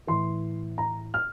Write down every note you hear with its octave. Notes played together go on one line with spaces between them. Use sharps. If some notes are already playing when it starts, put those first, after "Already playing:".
A2 E3 C6
A#5
F6